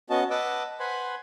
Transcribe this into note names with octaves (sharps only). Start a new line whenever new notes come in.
B3 C#4 F#4 D#5 A5
B4 D#5 F#5 A5 D6 E6
B4 C5 F#5 G#5 B5 C6